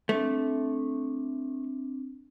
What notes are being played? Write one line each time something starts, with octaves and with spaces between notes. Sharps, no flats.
A3 C4 D4